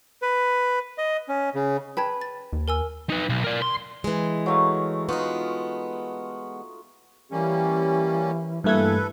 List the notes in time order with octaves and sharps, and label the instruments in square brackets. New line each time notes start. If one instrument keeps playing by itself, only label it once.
[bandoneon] B4
D#5
C#4
C#3
[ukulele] B4 [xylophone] G5 A5 G#6
[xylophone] A6
[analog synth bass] D#2
[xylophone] A#4 G#5 E6
[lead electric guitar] D#4 B4
B1
A#4 D5
C6
[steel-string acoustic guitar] E3 G#3
[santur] F#3 A3 F5
[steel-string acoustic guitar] G#3 B3 [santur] D#4 F4 F#4
[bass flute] E3 [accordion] G3 A#3 C#4 [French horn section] G4
[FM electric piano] G2 A3 G#6 [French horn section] E3 [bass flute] A#3 [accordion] A4 B4